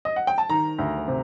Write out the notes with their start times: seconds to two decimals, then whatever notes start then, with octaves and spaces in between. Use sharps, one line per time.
0.05 D#5
0.16 F#5
0.27 G5
0.38 A5
0.49 D#3 A#5
0.78 D2
1.08 C3